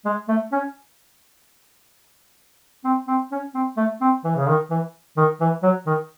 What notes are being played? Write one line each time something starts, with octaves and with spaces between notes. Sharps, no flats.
G#3
A3
C#4
C4
C4
C#4
C4
A3
C4
E3
C#3
D#3
E3
D#3
E3
F#3
D#3